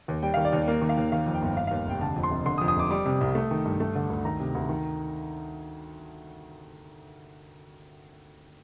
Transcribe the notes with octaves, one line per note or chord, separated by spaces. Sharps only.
D#2
G3 G5
D#3 F5
D5
D#2
A#3
D#3
F5
D#2
D#3 F5
F2
G5
G1
D#3 F5
D#2 F5
F1 G5
D3 A5
F2
C6
F1
D3 C6
D#6
F2
D#6
F1 D6
G3 D6
C3
C2
A3
D#3
G2
A3
D3
D2
D#3 A#5
C3
D2
D#3